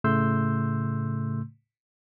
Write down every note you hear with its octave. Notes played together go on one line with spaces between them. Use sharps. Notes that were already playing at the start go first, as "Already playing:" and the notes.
A2 C#3 A3 C6 E6 G6